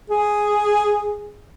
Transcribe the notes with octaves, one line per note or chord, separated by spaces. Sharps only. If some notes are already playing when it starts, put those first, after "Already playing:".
G#4